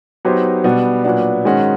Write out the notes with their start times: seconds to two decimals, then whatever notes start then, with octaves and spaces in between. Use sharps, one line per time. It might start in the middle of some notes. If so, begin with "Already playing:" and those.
0.25 F#3 B3 D#4 G4 C5
0.64 B2 G3 B3 D4
1.04 A#2 F#3 B3 D4
1.45 G#2 D#3 G#3 C#4 F#4